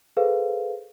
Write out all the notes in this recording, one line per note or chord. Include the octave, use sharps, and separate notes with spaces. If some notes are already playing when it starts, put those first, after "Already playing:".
G#4 A4 B4 C5 F5